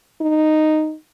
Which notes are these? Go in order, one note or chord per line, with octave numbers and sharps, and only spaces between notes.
D#4